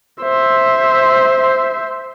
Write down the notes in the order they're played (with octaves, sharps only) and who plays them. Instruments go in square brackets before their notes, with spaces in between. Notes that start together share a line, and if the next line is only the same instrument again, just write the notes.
[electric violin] C5 E5